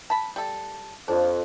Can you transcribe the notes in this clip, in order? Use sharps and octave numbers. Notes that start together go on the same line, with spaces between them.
A5 B5
G3 A4
F2 D4